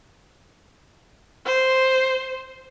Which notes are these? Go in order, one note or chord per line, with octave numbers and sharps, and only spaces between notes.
C5